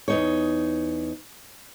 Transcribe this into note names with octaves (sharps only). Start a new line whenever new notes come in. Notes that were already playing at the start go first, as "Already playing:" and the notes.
E2 D#4 C#5